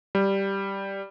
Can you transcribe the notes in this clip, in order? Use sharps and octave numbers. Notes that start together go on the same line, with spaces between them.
G3